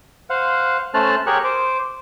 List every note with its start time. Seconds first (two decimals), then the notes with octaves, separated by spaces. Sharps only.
0.30 C5 F5 F#5
0.94 A3 C#4 C5 A5 F6 F#6
1.27 G4 G#4 A#4 C#5 C#6 F#6
1.44 C5 D6